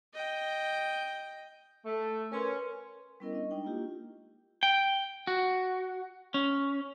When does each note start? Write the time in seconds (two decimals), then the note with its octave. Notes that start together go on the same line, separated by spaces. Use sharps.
0.14 D#5 G5
1.86 A3
2.32 C#4 A#4 B4 C6
3.20 G3 B3 C#4 E4 A#4 D#5
3.33 D4 D#5 C#6
3.51 G#3 D4 D#4 G5
3.64 A#3 E4 F4 G4
4.63 G5
5.27 F#4
6.34 C#4